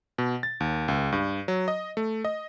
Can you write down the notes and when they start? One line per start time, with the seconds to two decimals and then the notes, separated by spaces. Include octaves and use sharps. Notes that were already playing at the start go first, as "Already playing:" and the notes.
0.18 B2
0.43 A6
0.60 D#2
0.88 C#2
1.12 G2
1.48 F#3
1.68 D#5
1.97 A3
2.25 D#5